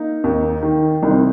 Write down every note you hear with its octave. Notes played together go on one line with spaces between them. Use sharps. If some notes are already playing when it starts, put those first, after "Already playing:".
Already playing: A#3 D#4
D#2
D#3
C2 D#4
C4